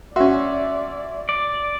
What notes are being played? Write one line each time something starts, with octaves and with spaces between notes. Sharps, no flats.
C#4 F#4 D5 E5 C6
D5